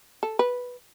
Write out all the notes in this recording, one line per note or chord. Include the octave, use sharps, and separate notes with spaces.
A4
B4